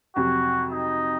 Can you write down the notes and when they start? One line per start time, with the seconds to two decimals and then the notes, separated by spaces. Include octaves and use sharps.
0.16 F2 C3 F#3 F#4
0.72 D#4